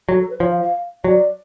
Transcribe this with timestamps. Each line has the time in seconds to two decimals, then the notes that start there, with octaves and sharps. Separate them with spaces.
0.08 F#3 A4
0.20 A4
0.30 B4
0.40 F3 C#5
0.51 F5
0.62 F5
1.04 F#3 D5